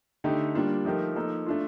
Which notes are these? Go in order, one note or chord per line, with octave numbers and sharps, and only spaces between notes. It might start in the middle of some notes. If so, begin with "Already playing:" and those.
D3 A3 D#4 G4
G3 A#3 D4 F4
F3 A3 D#4 G4 A#4
F3 A#3 D#4 A4
A3 D4 F4